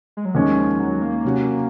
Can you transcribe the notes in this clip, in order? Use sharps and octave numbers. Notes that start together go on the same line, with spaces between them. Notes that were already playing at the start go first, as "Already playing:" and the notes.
G#3
F#3
D#2 D#3 F3 G#3 C#4
F3
F#3
A#3
C3 F#3 C#4 F#4 C#5